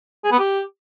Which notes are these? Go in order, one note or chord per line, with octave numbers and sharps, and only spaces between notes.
G#4
B3
G4